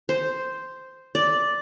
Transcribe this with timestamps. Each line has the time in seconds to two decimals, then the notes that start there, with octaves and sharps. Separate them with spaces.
0.09 C5
1.15 D5